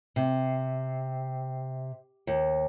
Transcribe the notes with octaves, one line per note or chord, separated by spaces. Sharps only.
C3
D#2